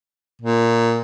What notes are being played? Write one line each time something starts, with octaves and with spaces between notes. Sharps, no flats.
A#2